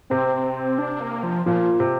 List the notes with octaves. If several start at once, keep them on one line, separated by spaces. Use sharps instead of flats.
C3 C4
D4
A#3
F3
A#2 F3
C3